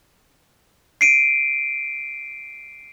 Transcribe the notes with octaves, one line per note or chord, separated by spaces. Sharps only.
C7 D7 D#7